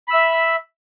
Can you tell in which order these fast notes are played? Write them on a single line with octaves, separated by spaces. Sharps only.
B5 E6 E5